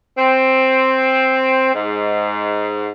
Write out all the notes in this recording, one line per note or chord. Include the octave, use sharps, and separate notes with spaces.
C4
G#2